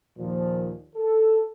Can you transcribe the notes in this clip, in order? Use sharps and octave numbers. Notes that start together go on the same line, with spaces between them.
D#2 A#2 F3
A4